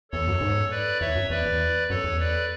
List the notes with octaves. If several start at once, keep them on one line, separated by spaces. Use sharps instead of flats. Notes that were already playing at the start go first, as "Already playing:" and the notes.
E2 A4 C#5
F#2
G#2
B4 D5
E2 C#5 E5
F#2
E2 B4 D5
E2
F#2 A4 C#5
E2
B4 D5